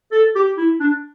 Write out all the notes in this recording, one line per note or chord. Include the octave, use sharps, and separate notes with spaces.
A4
G4
E4
D4